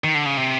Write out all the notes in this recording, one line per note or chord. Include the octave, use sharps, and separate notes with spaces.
D#3
D3
C#3
C3